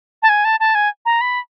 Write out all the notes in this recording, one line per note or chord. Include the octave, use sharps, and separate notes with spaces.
A5
G#5
A5
A5
G#5
A#5
B5